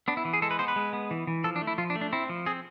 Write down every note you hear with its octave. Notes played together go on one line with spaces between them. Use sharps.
B3 D4
E4
E3
G#4
G#3 A4
B4
B3 C5
B4
G#3
B3
E3
E3
F3 A4
D4
A3
E4
F3 F4
D4
A3
D4
C4 E4
F3
C4 G#4